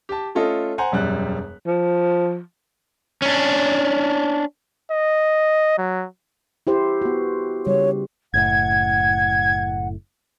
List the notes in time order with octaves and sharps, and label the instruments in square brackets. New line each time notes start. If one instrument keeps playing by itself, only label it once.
[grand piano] G4 A5
A3 C#4 F4 A4 D#5
C5 F#5 G#5 A#5
E1 F#2 G3 F#6
[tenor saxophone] F3
[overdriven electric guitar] C#4 D4
[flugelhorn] D#5
F#3
[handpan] E4 G4 C5
B3 F#4
[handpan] C#3 G3 [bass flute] C#5
[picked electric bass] F#1 A2 [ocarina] F#5 [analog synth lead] G#6